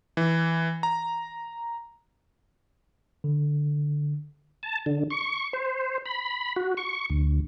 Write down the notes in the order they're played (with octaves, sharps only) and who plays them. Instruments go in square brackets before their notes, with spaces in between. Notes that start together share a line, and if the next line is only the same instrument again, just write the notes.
[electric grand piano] E3
A#5
[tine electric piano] D3
[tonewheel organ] A5
D3
C#6
C5
B5
F#4
C#6
D2